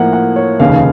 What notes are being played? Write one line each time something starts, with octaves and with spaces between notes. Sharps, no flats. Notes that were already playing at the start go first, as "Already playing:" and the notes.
Already playing: A2 F3 A#3 F#5
F#5
C#5
F1 D#2 C#3 F5